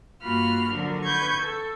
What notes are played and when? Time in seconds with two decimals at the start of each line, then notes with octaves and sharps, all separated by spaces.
0.21 G2 A#3 F4 F#4 B5 F6
0.68 D3 F3 F#3 D4 A#4
1.04 B4 C#6 G6 G#6
1.40 A4